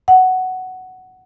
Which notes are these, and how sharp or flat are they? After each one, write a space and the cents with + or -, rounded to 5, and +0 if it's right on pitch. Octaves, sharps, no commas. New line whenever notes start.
F#5 +5